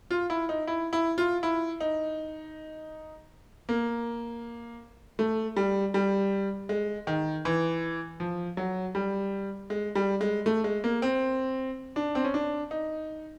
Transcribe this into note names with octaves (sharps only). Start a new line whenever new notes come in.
F4
E4
D#4
E4
E4
F4
E4
D#4
A#3
A3
G3
G3
G#3
D#3
E3
F3
F#3
G3
G#3
G3
G#3
A3
G#3
A#3
C4
D4
C4
C#4
D4
D#4